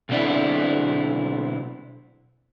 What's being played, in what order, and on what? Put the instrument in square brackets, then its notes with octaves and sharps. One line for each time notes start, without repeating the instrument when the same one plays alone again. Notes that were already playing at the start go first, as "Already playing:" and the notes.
[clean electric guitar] B1 B2 D3 C4 D4 E4